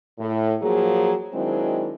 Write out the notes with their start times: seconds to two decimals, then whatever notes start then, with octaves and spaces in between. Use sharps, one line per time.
0.18 A2
0.61 F3 F#3 A#3 G#4
1.33 D#3 F#3 G#3 C4 D4 E4